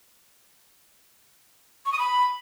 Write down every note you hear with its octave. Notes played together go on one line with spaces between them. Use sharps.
C#6
D#6
B5